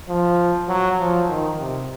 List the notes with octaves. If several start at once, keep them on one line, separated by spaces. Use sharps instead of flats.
F3
F#3
F3
D#3
C3